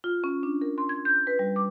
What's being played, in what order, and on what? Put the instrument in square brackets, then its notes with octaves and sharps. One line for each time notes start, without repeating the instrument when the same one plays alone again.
[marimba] F4
C#4
D4
A#4
C6
G#6
G6
B4
G3
D6